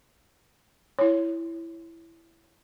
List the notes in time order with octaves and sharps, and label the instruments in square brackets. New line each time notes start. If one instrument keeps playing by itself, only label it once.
[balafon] E4 C#5